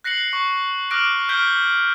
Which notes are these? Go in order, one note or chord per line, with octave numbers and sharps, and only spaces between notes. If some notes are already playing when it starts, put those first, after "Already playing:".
F#6 A#6 C7 C#7 F#7
C#6
D6 F6 F#6 A#6 D7 F#7
F6 G6 B6 D7 G7